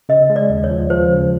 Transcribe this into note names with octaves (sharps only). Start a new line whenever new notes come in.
C#3 D#5
G#3
D5
D#2
C#5
F3
F3 C5
C#3